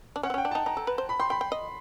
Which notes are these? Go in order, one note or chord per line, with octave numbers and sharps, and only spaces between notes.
D4
C#4 F#5
C4
C#4
G5
D4
D#4 A5
D#4 A#5
A4
B4
C5
B5
G5 C6
G5 B5
G5
D#5